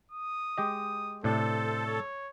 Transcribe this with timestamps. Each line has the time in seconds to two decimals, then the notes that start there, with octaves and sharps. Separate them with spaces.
0.11 D#6
0.58 G#3 G4 D#5
1.24 A2 C3 D4 A4 C5
1.86 C#5